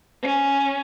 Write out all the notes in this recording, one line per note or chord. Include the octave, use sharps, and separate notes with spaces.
C#4